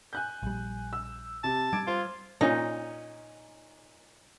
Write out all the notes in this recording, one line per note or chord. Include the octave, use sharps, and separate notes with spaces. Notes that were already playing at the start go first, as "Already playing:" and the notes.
G#5 F#6 G6
A#1 G3
E6
C3 A5
G3 D6 G#6 D7
F4 C5
A#2 C#4 D#4